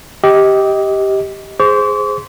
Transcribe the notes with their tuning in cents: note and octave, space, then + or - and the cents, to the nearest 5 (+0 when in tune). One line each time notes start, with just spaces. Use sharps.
G4 -5 D#5 +20
G#4 +0 C5 +0 D6 -45